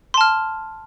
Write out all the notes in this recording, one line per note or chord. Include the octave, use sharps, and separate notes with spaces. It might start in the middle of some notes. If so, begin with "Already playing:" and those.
A5 C6 F6